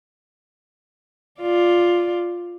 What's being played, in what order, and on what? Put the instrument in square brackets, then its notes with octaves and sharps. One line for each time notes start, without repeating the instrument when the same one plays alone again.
[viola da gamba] F4 D5